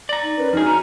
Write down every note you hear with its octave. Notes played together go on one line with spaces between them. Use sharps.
D5 A#5
D#4
C#4 A#4 B4 C#5
F2 D#4 F#4 G#4 F6
C#4 A#5